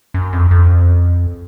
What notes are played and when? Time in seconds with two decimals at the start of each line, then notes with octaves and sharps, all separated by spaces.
0.14 F#2
0.33 F2
0.51 F2